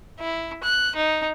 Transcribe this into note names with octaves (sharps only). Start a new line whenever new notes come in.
E4
F#6
D#4